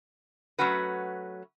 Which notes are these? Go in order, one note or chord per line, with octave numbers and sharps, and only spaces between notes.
F#3 A3 C#4 F#4 B4